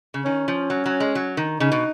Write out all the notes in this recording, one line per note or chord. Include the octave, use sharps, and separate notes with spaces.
C#3
D#3 C#4
F3
F#3
F#3
G#3
F#3
D#3
C#3 D#4
B2